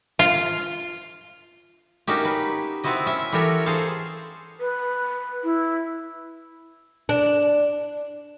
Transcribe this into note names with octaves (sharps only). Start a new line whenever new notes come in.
F4
A#3 C#4 D#4 F#4 G4
B4
B3 C4 E4 F#4 D#5
C#4 E5
E3 F#4 G4 A4 A#4 C#5
G#4 A4 C5 F5
B4
E4
D4